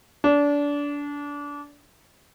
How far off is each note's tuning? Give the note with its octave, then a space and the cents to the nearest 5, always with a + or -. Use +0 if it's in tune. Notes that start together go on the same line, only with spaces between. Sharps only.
D4 -25